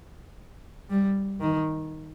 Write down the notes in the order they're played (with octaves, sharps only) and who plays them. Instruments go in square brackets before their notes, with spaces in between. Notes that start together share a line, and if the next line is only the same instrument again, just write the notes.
[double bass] G3
D#3